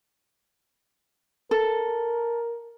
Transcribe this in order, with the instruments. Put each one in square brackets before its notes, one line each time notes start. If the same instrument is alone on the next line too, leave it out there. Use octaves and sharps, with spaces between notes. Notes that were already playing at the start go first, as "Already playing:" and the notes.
[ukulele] A4 [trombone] A#4